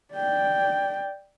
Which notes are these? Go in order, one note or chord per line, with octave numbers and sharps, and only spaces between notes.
D5 G5